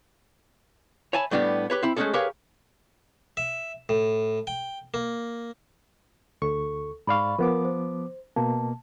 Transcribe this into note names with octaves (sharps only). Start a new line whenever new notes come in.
C#5 E5 G#5 A5 B5
A2 G3 B3 D4 F#4 G4
G4 B4 C#5
C4 E4 B5
G#3 A3 C4 C#4 G#4 A4
G4 G#4 A#4 B4 C#5 F5
E5
A2
G5
A#3
D2 A4 C#6
G#2 D5 F5 B5 C#6
F3 B3 A#4 D6
C5
B2 A#3 A5